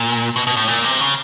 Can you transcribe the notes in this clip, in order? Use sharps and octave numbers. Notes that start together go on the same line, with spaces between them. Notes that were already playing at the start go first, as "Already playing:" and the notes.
Already playing: A#2
B2
B2
A2
A#2
C3
C#3